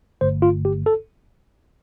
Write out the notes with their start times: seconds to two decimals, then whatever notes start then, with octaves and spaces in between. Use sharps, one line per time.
0.21 G1 G2 D3 A3 C5
0.42 F4
0.65 G4
0.86 A4